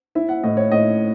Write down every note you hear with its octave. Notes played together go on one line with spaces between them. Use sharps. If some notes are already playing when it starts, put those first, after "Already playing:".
E4 E5
F#5
A2 D#5
C#5
A2 D#5